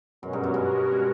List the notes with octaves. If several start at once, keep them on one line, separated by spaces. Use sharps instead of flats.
F#2 B2 G#3 C#4 F#4 A#4
G2
F#2
G2